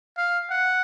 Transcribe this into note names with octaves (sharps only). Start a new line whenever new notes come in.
F5
F#5